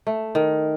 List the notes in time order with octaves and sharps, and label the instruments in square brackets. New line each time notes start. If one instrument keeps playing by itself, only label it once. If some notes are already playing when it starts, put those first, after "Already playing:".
[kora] A3
D#3